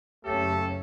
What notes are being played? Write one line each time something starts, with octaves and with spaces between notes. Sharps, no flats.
F#1 A3 C#4 G4 A4